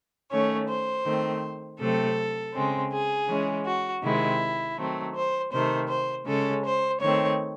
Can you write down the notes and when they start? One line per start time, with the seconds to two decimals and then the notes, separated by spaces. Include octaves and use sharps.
0.30 D#3 A3 C#4 C#5
0.68 C5
1.05 D#3 A3 C4
1.80 C3 F#3 A3 C4 A4
2.54 C#3 G#3 C4
2.92 G#4
3.29 E3 G#3 C#4
3.66 F#4
4.03 C3 D#3 G#3 C4 E4
4.77 D#3 F#3 A3 C4
5.15 C5
5.52 C3 D#3 A3 C5
5.90 C5
6.27 C#3 G#3 C#4 A4
6.64 C5
7.01 D#3 A3 C4 C#5